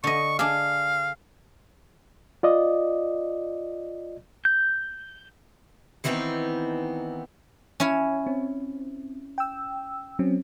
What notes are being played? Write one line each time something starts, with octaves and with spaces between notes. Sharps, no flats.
D3 D#5 C#6
D4 G#4 F5
F4 D5 D#5
G6
D#3 E3 G3 B3 C4 D#4
C#4 E4 C#5
C4
G5 E6
F#3 C4 C#4